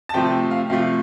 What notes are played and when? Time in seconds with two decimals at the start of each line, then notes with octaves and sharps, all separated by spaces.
0.09 A5
0.14 C3 F3 A3 G5
0.51 F5
0.70 C3 F3 A3 F5